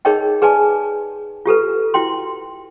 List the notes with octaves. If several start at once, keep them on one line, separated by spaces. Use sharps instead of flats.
D#4 G#4 A#4 C#5 D#5 G5
G#4 B4 D5 G#5 A5
F4 G4 A4 B4
E4 F#4 G5 C6